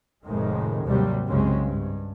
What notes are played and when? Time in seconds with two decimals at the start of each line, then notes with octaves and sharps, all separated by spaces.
0.24 F1 F2 A2 D#3 G#3
0.86 D#2 G#2 C3 F#3 G3
1.28 C2 F#2 C#3 G#3 C4 C#4
1.61 G2